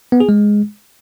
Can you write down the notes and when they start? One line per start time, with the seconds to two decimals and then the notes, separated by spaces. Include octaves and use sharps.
0.12 B3
0.20 G#4
0.29 G#3